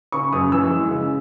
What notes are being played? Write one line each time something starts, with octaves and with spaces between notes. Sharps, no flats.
C#3 C#6
F#2 D#6
E3 E6
G#3
C#3